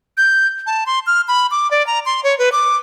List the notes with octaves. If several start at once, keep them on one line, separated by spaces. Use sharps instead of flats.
G6
A5
C6
F6
B5
D6
D5
A#5
C6
C#5
B4
D6